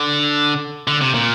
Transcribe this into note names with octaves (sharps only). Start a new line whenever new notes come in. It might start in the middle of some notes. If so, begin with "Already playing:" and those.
Already playing: D3
D3
C3
A#2